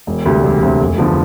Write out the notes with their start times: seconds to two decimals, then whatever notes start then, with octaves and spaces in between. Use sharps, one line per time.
0.07 E1
0.25 D2 C3 G3
0.44 E1
0.62 D2 C3 G3
0.81 F1
0.98 E2 D3 F3